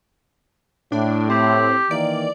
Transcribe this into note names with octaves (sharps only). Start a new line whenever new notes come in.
A2 D4
C4 G4
D#3 E3 A#3 D5